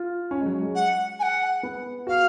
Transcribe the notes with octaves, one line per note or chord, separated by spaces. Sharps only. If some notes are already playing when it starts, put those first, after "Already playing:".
Already playing: F4
C#4
G#3
F#3
G#3
F#5
G#5
F#5
B3
F#4 F5